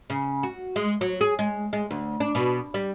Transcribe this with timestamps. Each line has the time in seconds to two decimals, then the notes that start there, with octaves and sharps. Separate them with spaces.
0.10 C#3
0.43 F#4
0.76 G#3
1.01 F#3
1.21 G#4
1.39 G#3
1.73 G#3
1.91 D2
2.20 D4
2.35 B2
2.74 G3